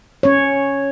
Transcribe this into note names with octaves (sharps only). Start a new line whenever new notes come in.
C#4 C#5